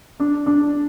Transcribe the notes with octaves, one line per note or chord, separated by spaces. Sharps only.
D4
D4